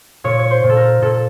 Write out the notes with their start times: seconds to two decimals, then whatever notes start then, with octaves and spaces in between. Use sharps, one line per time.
0.24 A#2 C#5
0.39 C#5
0.51 C5
0.64 A#2
0.70 A4
0.76 A#4
1.02 A#2 A4